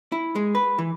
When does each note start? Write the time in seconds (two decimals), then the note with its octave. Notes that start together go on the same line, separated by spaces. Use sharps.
0.12 E4
0.36 G#3
0.55 B4
0.78 E3